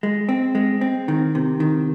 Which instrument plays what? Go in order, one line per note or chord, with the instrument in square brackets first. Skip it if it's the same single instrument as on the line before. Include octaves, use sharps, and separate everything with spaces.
[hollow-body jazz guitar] G#3
C4
G#3
C4
D#3
C3
D#3